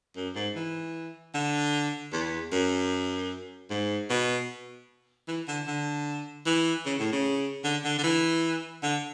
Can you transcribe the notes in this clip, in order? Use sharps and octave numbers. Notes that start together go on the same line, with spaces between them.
F#2
G#2
E3
D3
E2
F#2
G#2
B2
E3
D3
D3
E3
C#3
A2
C#3
D3
D3
D3
E3
D3